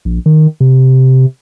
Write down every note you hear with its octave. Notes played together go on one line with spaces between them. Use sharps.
A#1
D#3
C3